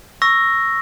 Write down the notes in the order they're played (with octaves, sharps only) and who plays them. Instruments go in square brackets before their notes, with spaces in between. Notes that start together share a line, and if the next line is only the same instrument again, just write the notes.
[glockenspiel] C#6 E6 A#6